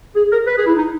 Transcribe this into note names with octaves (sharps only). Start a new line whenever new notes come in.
G#4
A#4
B4
G#4
E4
D#4